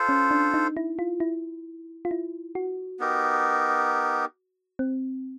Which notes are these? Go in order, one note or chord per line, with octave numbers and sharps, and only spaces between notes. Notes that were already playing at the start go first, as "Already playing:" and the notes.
Already playing: F4 A4 C5
C#4
D4
D#4
E4
F4
E4
F4
E4
F#4
B3 D#4 G4 A#4
C4